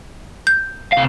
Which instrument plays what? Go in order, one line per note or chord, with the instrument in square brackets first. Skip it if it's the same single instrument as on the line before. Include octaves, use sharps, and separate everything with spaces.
[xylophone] G6
[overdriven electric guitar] C3 F5